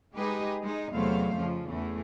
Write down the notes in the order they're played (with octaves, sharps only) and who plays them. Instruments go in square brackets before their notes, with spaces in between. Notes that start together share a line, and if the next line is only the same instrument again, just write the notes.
[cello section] G#3 D#4 G4 G#4 B4 D#5
G#3 D#4
E2 C3 F#3 A3 C5 F5
F2 C#3 F3
E2 E3 A3